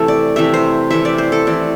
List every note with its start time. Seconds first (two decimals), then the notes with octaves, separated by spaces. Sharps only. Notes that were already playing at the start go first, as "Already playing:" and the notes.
Already playing: C3 E3 A3 A4
0.08 D5
0.36 C3 E3 A3 E5
0.54 C5
0.91 C3 E3 A3 E5
1.05 D5
1.18 C5
1.32 A4
1.46 C3 E3 A3 D5